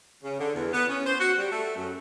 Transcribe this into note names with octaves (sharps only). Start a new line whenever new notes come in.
C#3
D3
E2
B3
C#4
C5
F#4
G3
A3
F#2